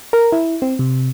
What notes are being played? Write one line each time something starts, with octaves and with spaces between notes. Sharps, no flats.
A#4
E4
C4
C3